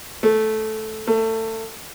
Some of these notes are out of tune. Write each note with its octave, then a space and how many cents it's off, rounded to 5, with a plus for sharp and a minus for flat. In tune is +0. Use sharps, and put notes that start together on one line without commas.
A3 -10
A3 +25